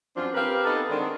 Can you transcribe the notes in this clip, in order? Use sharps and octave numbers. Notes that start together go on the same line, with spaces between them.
F#2 F3 C4 D4 F4
C4 G4 A#4 B4 F5
B3 D#4 A4
D3 D#3 G#3 C4 D4